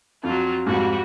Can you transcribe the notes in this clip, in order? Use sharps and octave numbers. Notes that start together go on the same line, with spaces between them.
F2 F#3 F4
F2 G#2 G3 F#4